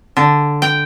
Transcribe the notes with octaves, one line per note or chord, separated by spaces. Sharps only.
D3
G5